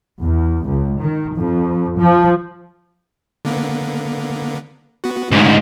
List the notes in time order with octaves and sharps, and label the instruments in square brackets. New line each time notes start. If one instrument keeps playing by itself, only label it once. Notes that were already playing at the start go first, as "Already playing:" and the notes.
[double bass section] E2
C#2
D#3
F2
F3
[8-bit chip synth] D3 A#3 B3
B3 F#4
[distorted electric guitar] D2 G#2 [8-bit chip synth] C#4